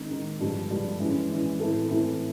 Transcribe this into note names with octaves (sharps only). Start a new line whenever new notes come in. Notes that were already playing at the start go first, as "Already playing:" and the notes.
Already playing: D#3 G#3 C4 D#4
D#3 G#3 C4 D#4
G2 D3 F3 G#3
G2 D3 F3 G#3
E3 G#3 C#4
E3 G#3 C#4
A2 E3 A3 C4 E4
A2 E3 A3 C4 E4